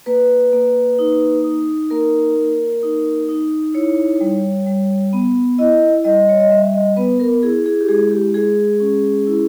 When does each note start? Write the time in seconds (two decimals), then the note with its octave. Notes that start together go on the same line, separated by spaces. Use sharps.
0.06 A#3 B4
0.53 A#3
0.99 D#4
1.44 D#4
1.90 A#3 A#4
2.36 A#3
2.83 D#4
3.29 D#4
3.74 E4 C#5
4.21 G3
4.67 G3
5.13 B3
5.58 E4 D#5
6.04 G3 D#5
6.29 C#5
6.40 D#5
6.50 G3 E5
6.74 D#5
6.96 B3 B4
7.19 A#4
7.43 E4 G#4
7.66 G#4
7.81 G4
7.88 G#3 G#4
8.11 G4
8.34 G#3 G#4
8.80 C#4
9.27 E4